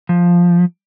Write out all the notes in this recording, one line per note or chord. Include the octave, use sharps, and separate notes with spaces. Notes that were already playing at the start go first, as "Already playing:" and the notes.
F3